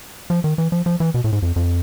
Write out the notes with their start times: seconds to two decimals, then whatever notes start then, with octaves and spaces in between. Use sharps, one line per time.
0.30 F3
0.44 D#3
0.58 E3
0.72 F3
0.86 F3
1.00 E3
1.14 B2
1.24 A2
1.33 G#2
1.42 F2
1.56 F2